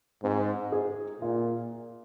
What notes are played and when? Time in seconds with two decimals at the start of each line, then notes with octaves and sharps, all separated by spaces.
0.23 G#2 C4
0.72 G#4
1.21 A#2 F4